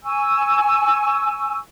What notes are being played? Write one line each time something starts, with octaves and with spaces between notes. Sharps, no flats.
G#5 C#6 E6